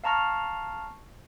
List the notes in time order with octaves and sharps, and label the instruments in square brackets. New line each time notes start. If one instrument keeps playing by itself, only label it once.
[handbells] F5 A5 A#5 C#6 F6